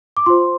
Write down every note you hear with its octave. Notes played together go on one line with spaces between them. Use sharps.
D6
F4 C5 C6